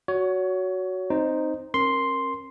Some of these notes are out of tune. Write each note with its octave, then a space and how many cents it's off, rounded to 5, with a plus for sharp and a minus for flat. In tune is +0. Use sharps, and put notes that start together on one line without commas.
F#4 +0 C#5 +25
C4 +0 D#4 -5 C5 +0
C#4 -40 A#4 +0 C6 +0